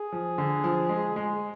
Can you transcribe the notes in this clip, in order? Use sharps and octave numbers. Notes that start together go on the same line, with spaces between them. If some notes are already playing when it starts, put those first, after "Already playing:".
Already playing: G#4
F3
D3
F3
G#3
G#3